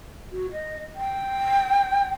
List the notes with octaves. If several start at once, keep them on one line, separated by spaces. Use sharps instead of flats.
F#4
D#5
G5